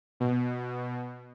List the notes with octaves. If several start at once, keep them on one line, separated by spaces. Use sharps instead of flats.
B2